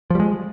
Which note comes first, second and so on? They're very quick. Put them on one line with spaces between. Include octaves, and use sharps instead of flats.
F3 G3 G#3